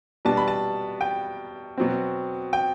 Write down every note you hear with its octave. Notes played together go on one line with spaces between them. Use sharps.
B2 G3 D4 A5
B5
A5
G5
B2 F#3 C4
G5